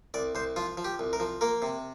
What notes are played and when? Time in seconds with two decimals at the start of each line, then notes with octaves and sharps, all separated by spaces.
0.14 C2 D5
0.35 C2 C5
0.56 F3 F4
0.77 F3
0.84 G4
0.99 C2
1.13 A#4
1.20 F3
1.41 A#3 A#4
1.62 C3